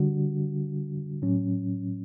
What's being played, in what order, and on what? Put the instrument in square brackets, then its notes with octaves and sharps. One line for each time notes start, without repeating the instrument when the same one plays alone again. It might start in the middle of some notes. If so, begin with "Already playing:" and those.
Already playing: [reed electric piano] D3 G3 D4 F#4
A2 F#3 C#4